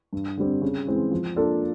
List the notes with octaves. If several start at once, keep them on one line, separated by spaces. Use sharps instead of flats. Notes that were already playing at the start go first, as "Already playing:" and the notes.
G2
D3 G3 C4
C#3
E3 G#3 C4
F3
A#3 D4 F4 A4